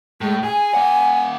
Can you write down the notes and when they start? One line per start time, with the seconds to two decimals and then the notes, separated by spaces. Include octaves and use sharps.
0.21 A2 G#3
0.43 G#4 G#5
0.74 A#3 F#5